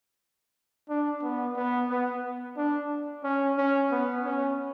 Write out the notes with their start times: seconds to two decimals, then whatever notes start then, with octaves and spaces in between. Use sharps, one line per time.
0.89 D4
1.23 B3
1.56 B3
1.90 B3
2.57 D4
3.24 C#4
3.58 C#4
3.91 B3
4.25 C#4